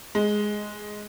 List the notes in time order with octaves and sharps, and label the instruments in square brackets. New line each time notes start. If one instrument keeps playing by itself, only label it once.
[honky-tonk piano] G#3